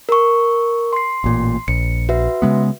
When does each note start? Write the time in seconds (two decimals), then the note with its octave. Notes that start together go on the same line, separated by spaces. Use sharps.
0.09 A#4 C#6
0.93 C6 C7
1.24 A1 A#2
1.68 A#1 C#7
2.09 F#4 B4 E5
2.42 C#3 G#3 B3